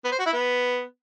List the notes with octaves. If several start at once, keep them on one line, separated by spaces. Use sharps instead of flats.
B3
C5
F#4
E4
B3